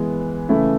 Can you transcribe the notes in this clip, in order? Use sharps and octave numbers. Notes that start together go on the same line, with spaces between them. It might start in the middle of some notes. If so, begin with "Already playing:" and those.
Already playing: E3 G#3 B3
C#3 E3 A3 E4